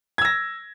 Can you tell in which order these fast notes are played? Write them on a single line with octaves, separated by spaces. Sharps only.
G#6 E6 A#6